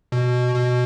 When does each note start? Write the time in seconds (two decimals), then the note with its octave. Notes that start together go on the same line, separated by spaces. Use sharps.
0.12 B2
0.55 B2